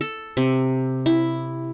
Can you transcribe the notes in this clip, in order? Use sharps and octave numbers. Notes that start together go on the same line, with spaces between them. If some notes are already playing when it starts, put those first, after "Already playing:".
A4
C3
E4